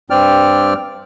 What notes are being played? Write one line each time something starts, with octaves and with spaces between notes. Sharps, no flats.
G2 C4 D5 G5 F6